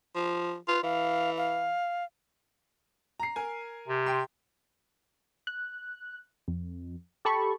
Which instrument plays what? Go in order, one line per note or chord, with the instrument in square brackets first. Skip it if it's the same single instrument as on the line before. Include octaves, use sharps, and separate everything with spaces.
[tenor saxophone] F3
[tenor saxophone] F4 [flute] B4
[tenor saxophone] E3 [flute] F5
[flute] F5
[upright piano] A#5 C7
A#4 G#5
[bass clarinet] C3
[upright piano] G5 C6
[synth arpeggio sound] F#6
F2
G4 A4 A5 B5 C#6